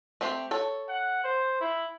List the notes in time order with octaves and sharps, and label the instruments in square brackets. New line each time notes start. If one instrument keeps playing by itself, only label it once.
[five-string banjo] A3 C4 G4
A4 C#5
[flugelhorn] F#5
C5
E4